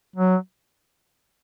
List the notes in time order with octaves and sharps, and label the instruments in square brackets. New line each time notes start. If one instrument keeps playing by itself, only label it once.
[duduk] F#3